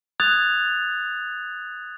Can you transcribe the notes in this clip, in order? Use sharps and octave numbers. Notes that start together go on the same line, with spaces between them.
D#6 F#6 G#6 A6 F7